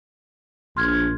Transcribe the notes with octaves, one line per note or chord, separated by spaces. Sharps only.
A#1 C6 F6 G#6